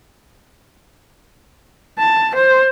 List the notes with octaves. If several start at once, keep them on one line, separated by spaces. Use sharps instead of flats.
A5
C5